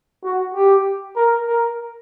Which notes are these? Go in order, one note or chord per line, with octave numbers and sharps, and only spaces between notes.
F#4
G4
A#4
A#4